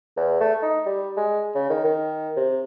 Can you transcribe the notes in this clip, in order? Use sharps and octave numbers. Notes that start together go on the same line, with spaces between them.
E2
A3
D#4
G3
G#3
C#3
D#3
D#3
C3